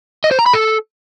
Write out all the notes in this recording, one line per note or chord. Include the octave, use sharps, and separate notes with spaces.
D#5
C5
A#5
B5
A4